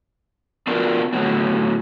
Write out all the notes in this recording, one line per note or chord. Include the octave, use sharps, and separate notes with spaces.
B3 D4 F4 F#4 A#4
A2 D3 F#3 B3